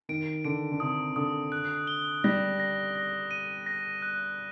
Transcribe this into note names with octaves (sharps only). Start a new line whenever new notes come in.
D#3 D7
D3 D7
D3
C3 D#6
D3 D#6
F#6
G7
G3 A#6
A#6
A#6
D#7
A#6
F#6